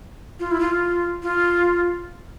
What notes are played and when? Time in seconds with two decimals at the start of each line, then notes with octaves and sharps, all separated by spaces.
0.40 F4
0.51 E4
0.60 F4
1.23 F4